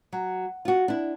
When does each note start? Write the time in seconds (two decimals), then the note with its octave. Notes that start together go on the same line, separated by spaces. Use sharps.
0.13 F#3
0.65 F4 F#4
0.88 D4 E4